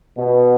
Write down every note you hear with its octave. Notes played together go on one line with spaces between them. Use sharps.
B2